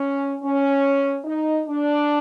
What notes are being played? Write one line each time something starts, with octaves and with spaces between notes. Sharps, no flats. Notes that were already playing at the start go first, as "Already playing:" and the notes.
Already playing: C#4
C#4
D#4
D4